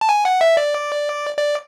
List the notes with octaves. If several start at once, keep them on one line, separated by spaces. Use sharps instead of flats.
A5
G#5
F#5
E5
D5
D5